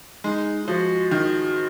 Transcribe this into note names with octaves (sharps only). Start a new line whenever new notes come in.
G#3 D#4
F4
F3 F#4
D#3 F#4